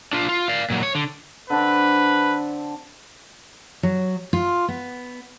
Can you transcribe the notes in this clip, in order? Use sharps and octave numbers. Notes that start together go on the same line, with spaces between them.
D4 F4
F4
D5 F5
A#2 F#3
C#5
D3
D3 C4 D4 B4
F#3
F4
B3